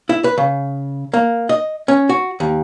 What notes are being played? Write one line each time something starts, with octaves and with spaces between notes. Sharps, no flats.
E4
B4
C#3
A#3
D#5
C#4
F#4
D#2